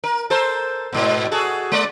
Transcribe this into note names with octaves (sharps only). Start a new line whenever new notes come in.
A#4
A4 A#4 C5
G#2 B2
F#4 G#4 A4
G#3 D5